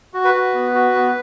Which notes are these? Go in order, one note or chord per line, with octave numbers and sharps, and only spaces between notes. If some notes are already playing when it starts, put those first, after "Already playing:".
F#4
B4
F#4
B3
F#4
B3